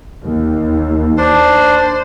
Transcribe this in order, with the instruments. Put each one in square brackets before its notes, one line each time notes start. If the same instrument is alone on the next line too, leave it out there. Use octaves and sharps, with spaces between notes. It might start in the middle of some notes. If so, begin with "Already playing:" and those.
[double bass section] D#2
[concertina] D4 [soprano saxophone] C5